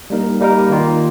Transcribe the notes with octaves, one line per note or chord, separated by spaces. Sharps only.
G3 A#3 D#4 A#4
G3 A#3 D#4 A#4
D#3 A#3 F4